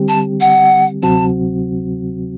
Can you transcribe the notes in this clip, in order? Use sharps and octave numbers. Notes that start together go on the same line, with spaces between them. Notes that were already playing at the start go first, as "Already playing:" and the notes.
Already playing: D3 G3 C4 G4
A5
F#5
D2 C3 F#3 C4 F#4 A5